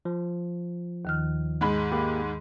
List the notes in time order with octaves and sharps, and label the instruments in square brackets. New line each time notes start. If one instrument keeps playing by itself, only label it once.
[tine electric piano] F3
[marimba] D#2 D#3 F6
[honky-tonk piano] G#2 G#3 B5
[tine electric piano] A#3 G4